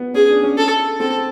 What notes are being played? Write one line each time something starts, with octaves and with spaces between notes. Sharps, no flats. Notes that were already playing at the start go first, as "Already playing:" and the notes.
Already playing: B3
C#4 G#4
D4
C#4
A4
C4 A4